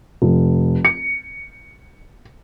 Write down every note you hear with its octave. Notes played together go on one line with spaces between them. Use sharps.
F1
C#7